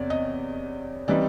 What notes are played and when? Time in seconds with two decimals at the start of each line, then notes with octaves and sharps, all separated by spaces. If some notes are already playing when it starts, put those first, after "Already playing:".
Already playing: E2 C3 C#5 D5
0.10 D#5
1.08 E3 G3 C4 D#4 D5